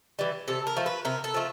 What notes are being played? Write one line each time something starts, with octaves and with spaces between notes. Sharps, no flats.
E3 G3
C3 A4
A#4
F3 A3
B4
C3 A#4
A4
F3 A3